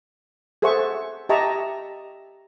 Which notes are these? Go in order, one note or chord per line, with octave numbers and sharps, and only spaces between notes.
G#4 A4 C5 E5 F#5 C#6
G4 D#5 E5 A5 A#5 C#6